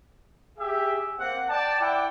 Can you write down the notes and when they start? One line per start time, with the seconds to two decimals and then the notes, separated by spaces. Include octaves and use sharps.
0.59 G4 G#4 E5
1.19 A#3 C4 F#5
1.50 D5 G5 A5
1.80 E4 D5 F#5 G5